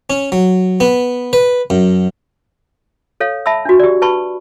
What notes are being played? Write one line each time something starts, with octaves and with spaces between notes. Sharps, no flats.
C#4
F#3
B3
B4
F#2
A4 C#5 F5
E5 A5 B5 E6
D4 F#4
G4 D5
B4 A5 B5 C#6